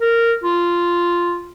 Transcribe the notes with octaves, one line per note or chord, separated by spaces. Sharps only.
A#4
F4